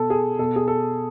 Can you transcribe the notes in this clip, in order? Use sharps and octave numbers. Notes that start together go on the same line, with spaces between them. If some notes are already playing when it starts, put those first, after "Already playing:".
Already playing: B2 A4
G#4
B2 A4
G#4
A4